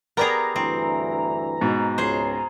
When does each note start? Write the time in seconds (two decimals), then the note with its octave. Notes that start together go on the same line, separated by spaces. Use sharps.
0.17 B3 G4 G#4 A#4 D5 A#5
0.56 D2 G2 E3 C4
1.61 G#2 B2
1.98 C#2 G#4 C5